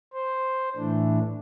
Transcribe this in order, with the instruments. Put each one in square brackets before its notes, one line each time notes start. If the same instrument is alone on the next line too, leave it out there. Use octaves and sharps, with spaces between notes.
[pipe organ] C5
A2 E3 A3 D4